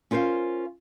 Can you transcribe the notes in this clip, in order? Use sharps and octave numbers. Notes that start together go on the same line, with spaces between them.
C#4 F4 A#4 C5 F5